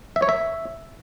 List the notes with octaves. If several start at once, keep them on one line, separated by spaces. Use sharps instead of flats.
E5
C#5
E5